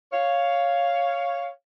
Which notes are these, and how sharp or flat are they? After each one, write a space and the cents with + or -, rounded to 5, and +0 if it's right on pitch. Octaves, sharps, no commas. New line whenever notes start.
C#5 +5 F5 +0